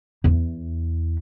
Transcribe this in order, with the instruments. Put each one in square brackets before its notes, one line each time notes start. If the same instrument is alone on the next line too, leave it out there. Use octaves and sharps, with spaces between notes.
[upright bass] E2 E4